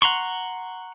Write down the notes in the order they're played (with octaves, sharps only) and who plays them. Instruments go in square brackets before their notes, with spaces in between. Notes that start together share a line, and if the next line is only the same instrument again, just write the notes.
[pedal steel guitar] F#5 A#5 C6 C#6